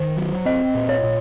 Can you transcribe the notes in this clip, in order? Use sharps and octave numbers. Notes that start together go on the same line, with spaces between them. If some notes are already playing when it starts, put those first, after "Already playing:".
Already playing: D#3 C5
F#3
C4 D#5
A#2
C#5
A#2